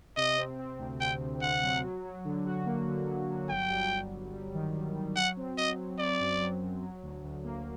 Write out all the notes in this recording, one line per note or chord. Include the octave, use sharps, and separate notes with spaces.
C3 D#5
C4
C4
D2
D2 G5
D2
D2 F#5
F#3
F#3
F#3
D3
F#4
A#3
D3
F#3
F#3
G1 G5
G3
G1
G1
G3
D#3
G3
G3
F#3 F#5
C4
F#3 D#5
F#3
C4 D5
F#2
F#3
F#2
F#3
D2
D2
A#3